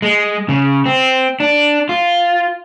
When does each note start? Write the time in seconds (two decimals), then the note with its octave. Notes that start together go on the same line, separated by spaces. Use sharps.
0.02 G#3
0.49 C#3
0.86 C4
1.40 D4
1.89 F4